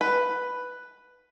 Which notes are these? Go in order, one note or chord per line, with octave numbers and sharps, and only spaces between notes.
B4